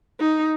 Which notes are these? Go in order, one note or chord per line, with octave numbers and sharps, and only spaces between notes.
D#4